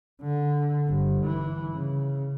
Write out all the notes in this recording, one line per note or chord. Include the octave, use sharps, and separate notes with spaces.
D3
G1
E3
C#3